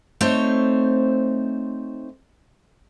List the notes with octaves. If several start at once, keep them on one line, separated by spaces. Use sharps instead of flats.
A3 C4 D#4 C5 C#5